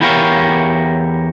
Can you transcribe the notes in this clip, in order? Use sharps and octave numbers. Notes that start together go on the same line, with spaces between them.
E2 E4 G4 A#4 C#5 F5